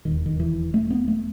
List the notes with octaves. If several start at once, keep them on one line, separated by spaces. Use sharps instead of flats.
E1 D#2 D#3
D#3
E3
A3
B3
A3